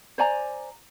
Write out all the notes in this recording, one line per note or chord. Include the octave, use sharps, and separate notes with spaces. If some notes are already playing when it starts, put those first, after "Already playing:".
C5 D5 G#5 A#5